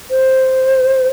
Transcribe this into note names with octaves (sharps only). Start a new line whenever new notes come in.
C5